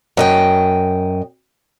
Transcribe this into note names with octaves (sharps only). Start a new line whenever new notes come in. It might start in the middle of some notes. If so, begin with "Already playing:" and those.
F#2 D#5 G5